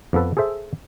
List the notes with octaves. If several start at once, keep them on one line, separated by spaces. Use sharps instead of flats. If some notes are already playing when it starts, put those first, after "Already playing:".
F2 F3 B3 A4 B4
G#4 A4 C5 E5